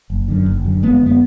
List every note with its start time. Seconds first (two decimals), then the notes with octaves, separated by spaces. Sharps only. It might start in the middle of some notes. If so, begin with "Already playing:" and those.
0.10 F#1
0.28 F#2 D3
0.46 F#1
0.65 F#2 D3
0.83 F#1 G#3 B3
1.00 F#2 D3
1.06 B3